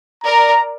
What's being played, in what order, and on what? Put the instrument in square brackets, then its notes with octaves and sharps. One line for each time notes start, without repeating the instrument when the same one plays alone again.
[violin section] A#4 D5 [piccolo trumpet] A#5